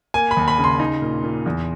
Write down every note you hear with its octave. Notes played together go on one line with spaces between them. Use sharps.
A#3 G#5
B5
D#2
B5
C#3
C6
D#4
A#2
A#2
E2